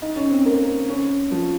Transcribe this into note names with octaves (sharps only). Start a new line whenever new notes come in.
D#4
C#4
C4
A#3
C#4
F3